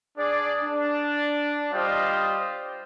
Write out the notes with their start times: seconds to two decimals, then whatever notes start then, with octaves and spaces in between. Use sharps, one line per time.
0.18 D4 G#4 D5
0.63 D4
1.72 G3 F4 G4 C5 D#5